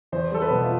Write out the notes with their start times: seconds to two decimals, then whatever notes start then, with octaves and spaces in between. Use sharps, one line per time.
0.12 E2 C5
0.31 G3 A4
0.42 B4
0.51 B2
0.64 F4